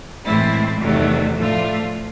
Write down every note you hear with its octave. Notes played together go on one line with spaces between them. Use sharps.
A2 E3 G#3 C4 E4
E2 C3 D#3 F#3 A3
A2 F3 A3 D4 F4